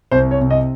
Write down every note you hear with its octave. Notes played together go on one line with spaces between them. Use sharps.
C2 C5
C#5
C3
D#5